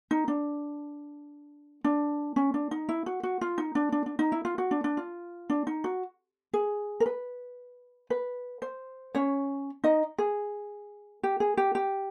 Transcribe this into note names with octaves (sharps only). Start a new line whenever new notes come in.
D#4
D4
D4
C#4
D4
D#4
E4
F#4
F#4
F4
D#4
D4
D4
D4
D#4
E4
F4
F#4
D4
D4
F4
D4
D#4
F#4
G#4
A#4
B4
B4
C5
C#4 C#5
D#4 D#5
G#4
G4
G#4
G4
G4